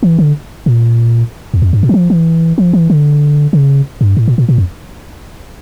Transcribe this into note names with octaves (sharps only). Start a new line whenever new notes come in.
E3
D3
A#2
E2
F2
G2
A#2
E3
F3
E3
F3
E3
D3
C#3
G2
A2
A#2
A#2
A#2
F2